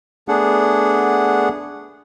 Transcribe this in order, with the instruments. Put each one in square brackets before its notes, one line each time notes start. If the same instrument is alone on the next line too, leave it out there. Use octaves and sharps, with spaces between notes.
[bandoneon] A3 B3 D4 G#4 F#5